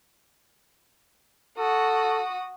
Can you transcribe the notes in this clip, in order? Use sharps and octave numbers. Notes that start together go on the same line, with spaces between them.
F#4 A4 D#6